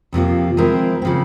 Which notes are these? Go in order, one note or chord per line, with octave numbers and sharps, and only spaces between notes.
F2 C3 F3 A#3 F4
F3 G#3 C4 E4 A#4
C#3 F3 C4